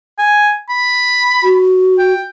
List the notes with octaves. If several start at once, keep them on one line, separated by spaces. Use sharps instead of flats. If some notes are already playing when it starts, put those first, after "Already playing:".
G#5
B5
F#4
G5